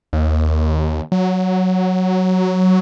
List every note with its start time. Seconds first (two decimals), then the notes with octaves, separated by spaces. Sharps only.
0.13 D#2
1.12 F#3